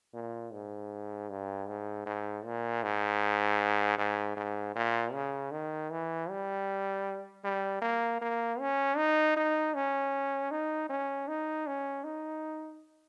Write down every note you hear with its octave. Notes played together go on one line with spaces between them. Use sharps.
A#2
G#2
G2
G#2
G#2
A#2
G#2
G#2
G#2
A#2
C#3
D#3
E3
G3
G3
A#3
A#3
C#4
D#4
D#4
C#4
D#4
C#4
D#4
C#4
D#4